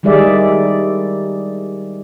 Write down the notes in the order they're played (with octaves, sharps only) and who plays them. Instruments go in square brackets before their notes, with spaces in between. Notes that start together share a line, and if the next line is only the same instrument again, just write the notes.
[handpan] D#3 G3 G#3 G#4 D5 E5